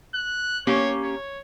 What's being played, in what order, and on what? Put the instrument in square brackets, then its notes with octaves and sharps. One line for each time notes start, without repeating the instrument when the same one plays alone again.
[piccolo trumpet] F#6
[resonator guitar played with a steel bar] A#3 C#4 G4 [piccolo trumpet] C#5
[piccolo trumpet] C#5